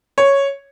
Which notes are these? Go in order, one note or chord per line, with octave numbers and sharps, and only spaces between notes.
C#5